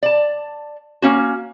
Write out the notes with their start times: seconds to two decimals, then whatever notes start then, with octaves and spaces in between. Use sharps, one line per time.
0.03 D5 A5
1.02 A#3 C#4 F#4